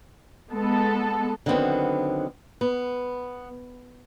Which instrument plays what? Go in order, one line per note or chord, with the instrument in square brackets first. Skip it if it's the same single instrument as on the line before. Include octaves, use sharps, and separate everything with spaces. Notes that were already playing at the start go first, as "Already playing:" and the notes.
[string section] G#3 B3 A4
[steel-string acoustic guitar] D3 D#3 F#3 B3 C4
B3